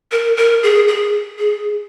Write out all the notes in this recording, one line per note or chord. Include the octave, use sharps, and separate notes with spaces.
A#4
A#4
G#4
G#4
G#4